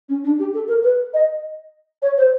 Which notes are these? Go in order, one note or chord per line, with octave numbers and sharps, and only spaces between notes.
C#4
D4
G4
A4
A#4
B4
D#5
C#5
C5